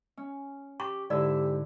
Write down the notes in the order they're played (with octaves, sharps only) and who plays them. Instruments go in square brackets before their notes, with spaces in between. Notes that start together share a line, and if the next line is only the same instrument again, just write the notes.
[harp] C#4
[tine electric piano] G4 [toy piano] C#6
[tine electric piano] G#2 [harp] D3 E4 E6 [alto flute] G4 [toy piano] D5